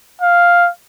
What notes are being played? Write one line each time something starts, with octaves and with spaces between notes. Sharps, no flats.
F5